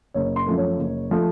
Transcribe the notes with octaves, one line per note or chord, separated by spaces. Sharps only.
F#1 C#5
C6
F#2 F3 A3
C#5
F#1
F3 A3